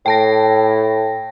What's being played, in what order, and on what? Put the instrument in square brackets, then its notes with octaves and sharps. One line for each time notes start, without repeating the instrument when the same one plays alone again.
[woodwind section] A2 [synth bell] G5 A5 A#6